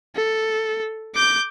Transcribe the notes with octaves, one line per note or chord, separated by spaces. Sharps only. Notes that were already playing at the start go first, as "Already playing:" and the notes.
A4
D6 G6